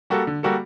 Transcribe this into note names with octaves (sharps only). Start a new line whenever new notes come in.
G3 A#3 F#4 A4
D3
G3 A#3 F#4 A4